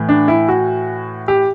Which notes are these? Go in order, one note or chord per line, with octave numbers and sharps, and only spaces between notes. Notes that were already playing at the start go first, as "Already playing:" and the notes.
Already playing: A2 E3
D4
E4
F#4
G4